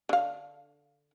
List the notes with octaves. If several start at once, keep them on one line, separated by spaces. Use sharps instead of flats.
D3 F5